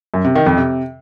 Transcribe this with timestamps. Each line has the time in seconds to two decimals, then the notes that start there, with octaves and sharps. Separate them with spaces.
0.14 F#2
0.25 C3
0.35 D#3
0.46 F2
0.57 C3